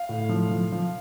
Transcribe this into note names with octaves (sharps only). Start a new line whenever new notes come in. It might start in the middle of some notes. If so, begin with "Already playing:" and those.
Already playing: F5
A2
F3
F3
F3